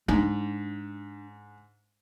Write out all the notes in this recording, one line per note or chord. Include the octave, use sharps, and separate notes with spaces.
G#2 D4